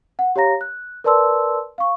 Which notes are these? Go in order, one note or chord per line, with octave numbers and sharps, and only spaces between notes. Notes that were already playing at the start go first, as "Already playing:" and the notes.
F#5
G4 C#5 F5 A#5 A#6
F#6
A#4 B4 D5 A5 C6 E6
F5 C#6